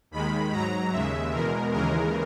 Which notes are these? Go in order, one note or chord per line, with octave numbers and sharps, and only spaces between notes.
D#2 D#3 G#3 B5
G#2 F#3 A#5
D#2 C#3 G#3 E5
E2 B2 G#3 A#4
D#2 C#3 E3 G#3 A#4